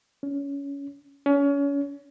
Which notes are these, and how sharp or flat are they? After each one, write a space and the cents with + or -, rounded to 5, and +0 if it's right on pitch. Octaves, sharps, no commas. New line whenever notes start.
C#4 +20
C#4 +30